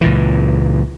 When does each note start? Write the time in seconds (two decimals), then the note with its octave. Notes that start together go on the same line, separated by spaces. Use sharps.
0.01 C#2 A#2 E3